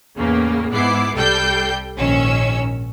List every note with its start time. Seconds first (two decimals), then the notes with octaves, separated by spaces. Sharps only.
0.17 E2 A2 C#3 A#3
0.70 G#2 B3 E4 D6 C7
1.16 C2 G3 A4 G5 G6 C7
1.95 A#1 G#2 D#3 C#4 E6